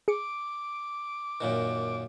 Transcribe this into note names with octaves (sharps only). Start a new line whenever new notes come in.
G#4 D6 C#7 D7
F#2 A#2 D#3